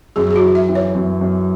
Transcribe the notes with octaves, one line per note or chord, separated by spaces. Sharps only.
F#2 G#4
G#4
F#4
E3
E5
E3
C#5
F#2
F#2